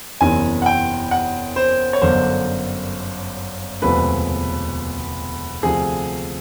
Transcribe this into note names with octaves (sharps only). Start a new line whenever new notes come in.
F#1 E2 C3 E3 G#5
F#5
G5
F#5
C5
C#5
G1 F#2 D3 C5
E1 D2 C3 F3 G#3 B4
D2 C3 F3 G#4